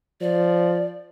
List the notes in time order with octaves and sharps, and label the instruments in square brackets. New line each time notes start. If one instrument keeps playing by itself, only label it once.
[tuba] F3 [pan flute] D5